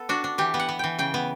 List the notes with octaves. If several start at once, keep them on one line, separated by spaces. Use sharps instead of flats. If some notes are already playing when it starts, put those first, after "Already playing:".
Already playing: B3 A4
D4 F#4
D4
E3 G4
B3
F#5
B3
E3 G5
C#3 G5
B3